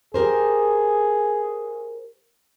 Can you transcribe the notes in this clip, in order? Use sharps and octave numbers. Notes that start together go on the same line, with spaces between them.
G4 G#4 A#4 C5